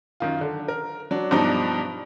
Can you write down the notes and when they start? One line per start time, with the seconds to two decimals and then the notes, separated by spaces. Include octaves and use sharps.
0.20 F#2 D#3 F4
0.41 D3
0.68 A#4
1.11 F#3 D4
1.31 G2 B2 F3 D4 D#4 A#5